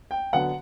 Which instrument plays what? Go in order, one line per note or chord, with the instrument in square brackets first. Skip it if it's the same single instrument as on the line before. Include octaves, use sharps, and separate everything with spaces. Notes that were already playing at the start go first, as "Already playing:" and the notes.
[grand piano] G5
D3 F#3 B3 F#5